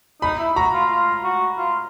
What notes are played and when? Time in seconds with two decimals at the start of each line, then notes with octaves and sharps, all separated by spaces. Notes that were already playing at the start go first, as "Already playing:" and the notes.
0.22 D#4 B5
0.39 E4
0.56 F#4 A#5
0.73 F4
0.90 F4
1.24 F#4
1.58 F4